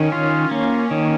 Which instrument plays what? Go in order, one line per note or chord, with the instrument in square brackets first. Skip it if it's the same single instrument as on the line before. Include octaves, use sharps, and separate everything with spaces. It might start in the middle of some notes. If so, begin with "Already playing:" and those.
Already playing: [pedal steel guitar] D#3 [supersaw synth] C#4
[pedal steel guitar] F4
A#3
D#3